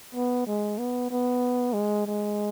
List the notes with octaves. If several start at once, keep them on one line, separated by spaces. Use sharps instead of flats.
B3
G#3
B3
B3
G#3
G#3